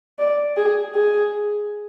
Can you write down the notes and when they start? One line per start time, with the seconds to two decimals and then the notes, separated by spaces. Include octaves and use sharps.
0.19 D5
0.57 G#4
0.94 G#4